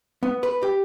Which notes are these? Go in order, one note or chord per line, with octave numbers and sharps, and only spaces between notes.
B3
B4
G4